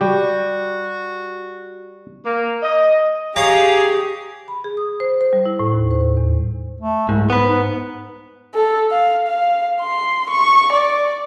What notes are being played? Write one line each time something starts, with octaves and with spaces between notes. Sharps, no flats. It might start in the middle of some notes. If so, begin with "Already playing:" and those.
G3 F#4 G4
A#3
D#5
G4 G#4 C#5 F5 A#5
B5
G#4
D#6
C5
C5
G3
E4
A2
D#2
C5
E2
A3
C2 G#2
G#2 B3 B4
G#2
A4
F5
F5
C6
C#6
D5